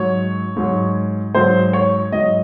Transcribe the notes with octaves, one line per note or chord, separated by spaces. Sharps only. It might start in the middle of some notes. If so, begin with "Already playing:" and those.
Already playing: G#2 F#3 C#5
G#2 F#3
G#2 F#3 C5
C#5
G#2 F#3 D#5